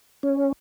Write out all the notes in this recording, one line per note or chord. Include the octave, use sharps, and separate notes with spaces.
C#4